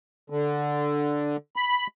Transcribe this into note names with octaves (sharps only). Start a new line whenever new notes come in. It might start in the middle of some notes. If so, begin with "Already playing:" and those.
D3
B5